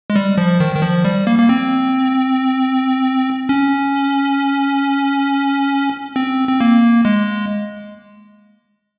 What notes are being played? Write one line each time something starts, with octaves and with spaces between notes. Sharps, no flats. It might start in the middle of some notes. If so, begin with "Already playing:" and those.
G#3
G3
F3
D#3
D#3
F3
G3
A#3
A#3
C4
C#4
C4
C4
A#3
G#3